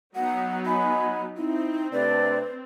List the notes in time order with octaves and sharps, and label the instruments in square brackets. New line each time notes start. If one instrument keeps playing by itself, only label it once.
[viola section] F#3 B3 D#4 [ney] F#5
[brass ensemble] D#5 F#5 G#5 [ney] B5
[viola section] C4 [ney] D#4 [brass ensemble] E4
[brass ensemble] C3 A3 D4 [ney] B4 [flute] D5